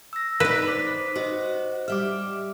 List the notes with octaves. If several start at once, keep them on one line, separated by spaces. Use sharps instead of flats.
E6 A#6
D#4 B4 D5
C5 D6 B6
F#4 C5 D#5
G3 E5 D6 F6